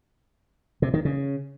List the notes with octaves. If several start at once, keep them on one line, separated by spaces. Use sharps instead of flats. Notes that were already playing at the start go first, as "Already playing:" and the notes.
C3
D#3
C#3